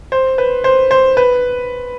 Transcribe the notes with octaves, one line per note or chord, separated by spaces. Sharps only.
C5
B4
C5
C5
B4